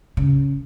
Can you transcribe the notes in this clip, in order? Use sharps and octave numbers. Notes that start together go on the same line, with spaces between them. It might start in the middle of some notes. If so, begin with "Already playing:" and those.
C#3